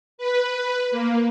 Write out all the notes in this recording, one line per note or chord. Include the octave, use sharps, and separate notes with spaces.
B4
A#3